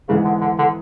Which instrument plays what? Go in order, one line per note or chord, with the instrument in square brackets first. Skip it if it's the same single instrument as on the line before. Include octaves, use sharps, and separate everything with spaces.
[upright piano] G#2 E3 G#3 B3 [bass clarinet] C#3
[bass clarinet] D3
D3
D3